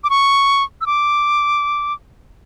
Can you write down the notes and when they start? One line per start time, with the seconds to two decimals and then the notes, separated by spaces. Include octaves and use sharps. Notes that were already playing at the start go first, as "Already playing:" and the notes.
0.04 D6
0.10 C#6
0.81 E6
0.86 D6